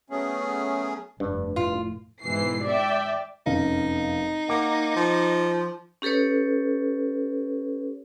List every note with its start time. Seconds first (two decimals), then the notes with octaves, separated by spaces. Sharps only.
0.10 F#3 A3 B3 C#4 G#4
1.20 F1 G2 D4
1.56 A2 F4
2.24 G#2 B2 E3 C7
2.65 D5 E5 G5
3.46 F1 F#2 D#4 F5
4.49 A#3 F#5 D6
4.96 F3
6.02 C#4 G4 A4 B4 C#5